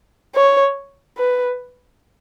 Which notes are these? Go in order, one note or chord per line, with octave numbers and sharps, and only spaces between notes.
C#5
B4